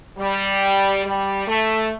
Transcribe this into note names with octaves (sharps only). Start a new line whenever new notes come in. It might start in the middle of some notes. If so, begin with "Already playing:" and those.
G3
G3
A3